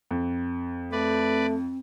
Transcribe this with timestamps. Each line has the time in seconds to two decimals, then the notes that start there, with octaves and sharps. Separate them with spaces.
0.11 F2
0.92 A3 C4 B4 D5